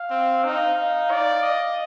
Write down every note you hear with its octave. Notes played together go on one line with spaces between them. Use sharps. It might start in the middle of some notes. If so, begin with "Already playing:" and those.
Already playing: F5
C4
D#4 F5
F5
D5
D#5